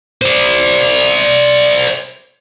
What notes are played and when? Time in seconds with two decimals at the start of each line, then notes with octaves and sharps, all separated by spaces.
0.22 C5 D5